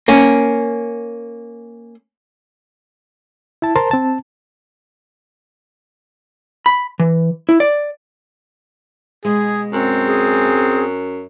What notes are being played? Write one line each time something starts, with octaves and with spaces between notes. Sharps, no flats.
A#3 C#4
E4 A5
A#4 C5 A5 A#5 C6
C4 A5
B5
E3
E4
D5
B2 G#3 G#4
F#2 C4
G#4